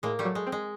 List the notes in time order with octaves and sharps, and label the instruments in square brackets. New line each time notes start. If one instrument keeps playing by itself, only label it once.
[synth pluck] A2 [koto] G#3 A#3
[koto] G3 A3
[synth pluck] F#3
[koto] G#3
[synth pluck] C4
[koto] G#3